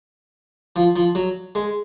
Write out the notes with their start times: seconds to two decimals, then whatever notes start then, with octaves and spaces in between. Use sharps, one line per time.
0.76 F3
0.96 F3
1.15 F#3
1.55 G#3